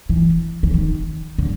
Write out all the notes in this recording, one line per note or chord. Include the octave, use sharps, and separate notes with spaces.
E3
E3
D#3
D3